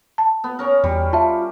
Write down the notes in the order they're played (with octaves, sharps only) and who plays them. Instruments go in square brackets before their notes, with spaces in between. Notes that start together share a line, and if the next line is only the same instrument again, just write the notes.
[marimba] A5
[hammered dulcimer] B3
C#4 A#4
[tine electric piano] E2 [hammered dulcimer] G3
[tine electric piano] F4 [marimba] E5 A5